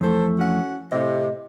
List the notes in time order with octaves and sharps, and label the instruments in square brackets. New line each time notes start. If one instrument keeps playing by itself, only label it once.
[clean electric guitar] F2 E3 A3 [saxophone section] A4 C5
[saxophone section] C#4 F#4 F#5
[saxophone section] A2 C3 [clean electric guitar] D#5